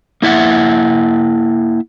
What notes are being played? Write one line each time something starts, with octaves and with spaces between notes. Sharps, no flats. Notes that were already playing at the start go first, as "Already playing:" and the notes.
A#3 E4 E5 F#5